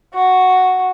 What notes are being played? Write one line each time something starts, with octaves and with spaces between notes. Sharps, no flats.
F#4